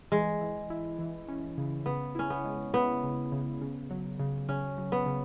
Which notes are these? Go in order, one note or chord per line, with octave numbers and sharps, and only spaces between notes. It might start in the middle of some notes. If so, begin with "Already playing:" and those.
E3 G#3
E3
E4
E3
C#4
C#3
C#3 B3
C#4 E4
B3
G#3
B3 E4
C#3
C#3
C#3
F#3
C#3
C#3 C#4
F#3
B3
C#3